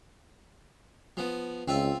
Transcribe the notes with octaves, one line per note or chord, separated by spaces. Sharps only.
F3 B3
C#2 C4 F4 E5